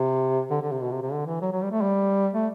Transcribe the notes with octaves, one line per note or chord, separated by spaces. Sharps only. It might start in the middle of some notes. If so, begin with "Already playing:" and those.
Already playing: C3
D3
D3
C3
B2
C3
C3
D3
E3
F#3
F#3
G3
A3
G3
A3